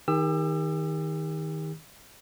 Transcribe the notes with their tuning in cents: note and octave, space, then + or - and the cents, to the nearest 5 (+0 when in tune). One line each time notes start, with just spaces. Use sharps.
D#3 +20 G4 +45 E6 +25